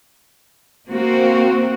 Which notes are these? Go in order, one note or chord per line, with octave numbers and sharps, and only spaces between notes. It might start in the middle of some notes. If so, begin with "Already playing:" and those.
A#3 C4 F#4